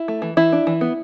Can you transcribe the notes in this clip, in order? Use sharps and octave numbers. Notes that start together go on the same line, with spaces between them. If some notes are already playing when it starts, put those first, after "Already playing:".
Already playing: E4
A3
E3
E3 E4
D4
E3
B3